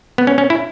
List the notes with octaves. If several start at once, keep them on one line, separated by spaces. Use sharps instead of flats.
B3
C#4
C#4
E4